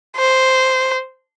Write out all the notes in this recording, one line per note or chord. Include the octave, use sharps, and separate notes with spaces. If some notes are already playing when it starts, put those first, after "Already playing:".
C5